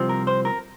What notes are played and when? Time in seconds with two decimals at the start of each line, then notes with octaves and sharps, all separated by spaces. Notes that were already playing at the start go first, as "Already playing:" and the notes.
Already playing: C2 C3 F3 C4
0.09 A#4
0.27 C5
0.45 A#4